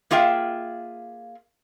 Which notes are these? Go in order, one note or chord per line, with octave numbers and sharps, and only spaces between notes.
A#3 F4 G#4 E5 G5